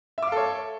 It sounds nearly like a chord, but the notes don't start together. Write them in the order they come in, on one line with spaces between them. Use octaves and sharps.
E5 D6 F5 A4 C#5